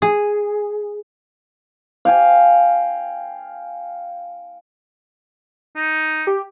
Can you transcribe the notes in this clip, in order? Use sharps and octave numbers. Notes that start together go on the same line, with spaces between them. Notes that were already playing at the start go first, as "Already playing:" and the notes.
G#4
F5 G5 G#5
D#4
G4